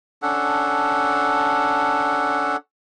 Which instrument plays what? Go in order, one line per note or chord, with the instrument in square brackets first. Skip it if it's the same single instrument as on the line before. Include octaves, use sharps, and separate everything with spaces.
[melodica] C#4 D4 A4 F#5